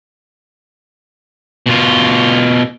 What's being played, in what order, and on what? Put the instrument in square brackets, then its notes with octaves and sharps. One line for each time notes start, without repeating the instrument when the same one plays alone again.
[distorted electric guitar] B2 F4